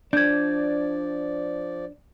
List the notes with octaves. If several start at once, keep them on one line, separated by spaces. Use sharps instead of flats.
F3 D4 D5 G6 G#6